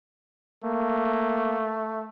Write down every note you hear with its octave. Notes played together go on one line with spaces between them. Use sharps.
A3 A#3